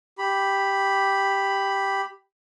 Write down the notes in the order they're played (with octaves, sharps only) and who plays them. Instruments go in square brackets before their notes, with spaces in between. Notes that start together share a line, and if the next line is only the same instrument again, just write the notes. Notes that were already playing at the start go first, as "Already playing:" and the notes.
[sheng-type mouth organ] G4 B5